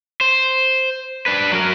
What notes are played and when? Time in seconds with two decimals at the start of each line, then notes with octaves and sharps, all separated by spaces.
0.21 C5
1.26 D4 B4
1.51 F#3 A#4